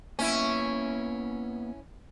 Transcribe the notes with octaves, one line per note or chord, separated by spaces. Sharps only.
A#3 B3 C#4 E4 E5